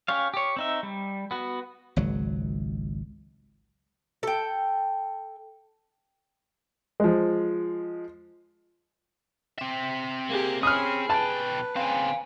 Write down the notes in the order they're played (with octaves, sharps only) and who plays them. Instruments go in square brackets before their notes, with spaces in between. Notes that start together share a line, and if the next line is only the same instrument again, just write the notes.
[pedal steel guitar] C#4 G4 C#5 F5
G4 C#5
C4 D#4 E5
G3
B3 F#4
[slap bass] G#1 C#2 F#3
[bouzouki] A4 G5
[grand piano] F3 G#3
[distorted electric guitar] C4 E5
[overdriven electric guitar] A#3 [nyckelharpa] G4 G#4
[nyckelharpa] C#4 B5 [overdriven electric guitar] G#4 [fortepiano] D#6 F6
[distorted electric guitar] B1 G5 [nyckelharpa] B4 [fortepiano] A5
[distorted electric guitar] C#3 C4 [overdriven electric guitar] F5 G#5